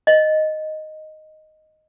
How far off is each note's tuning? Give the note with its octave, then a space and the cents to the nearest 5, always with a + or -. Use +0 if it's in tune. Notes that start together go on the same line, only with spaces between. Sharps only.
D#5 +0